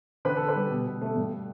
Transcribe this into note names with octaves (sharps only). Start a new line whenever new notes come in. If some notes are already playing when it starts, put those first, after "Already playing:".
D3 B4
D3 A4
B4
G3
B2
B2
A3
G2